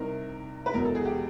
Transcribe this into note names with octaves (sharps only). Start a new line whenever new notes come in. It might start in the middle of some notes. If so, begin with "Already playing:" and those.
Already playing: C2 C3 D#3 A#4
B4
E1 E2 B2 F#3 A#4
A4
G#4
G4